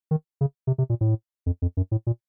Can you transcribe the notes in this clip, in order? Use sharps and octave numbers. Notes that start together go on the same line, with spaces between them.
D#3
C#3
C3
C3
A#2
A2
F2
F2
F#2
A2
A#2